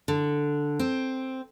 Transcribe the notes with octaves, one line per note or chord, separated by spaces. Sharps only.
D3
C4